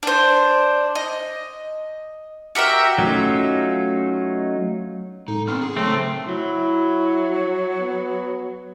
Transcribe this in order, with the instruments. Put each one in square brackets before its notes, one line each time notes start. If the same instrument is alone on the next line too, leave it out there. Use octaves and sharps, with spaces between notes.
[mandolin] D4 C5
D#5
F#4 G4 A#4 E5
[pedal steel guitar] F#3 A3 C#4 D#4 F4
[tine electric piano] A2 G#3 A4 [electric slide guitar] D#4
[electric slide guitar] B3 C4 D4 [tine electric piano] F6
[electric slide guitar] G#4
[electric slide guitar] C#3 C#5 A5 [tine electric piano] F#3 [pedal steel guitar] A3 C4
[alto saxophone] F#3 [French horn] E4
[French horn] B3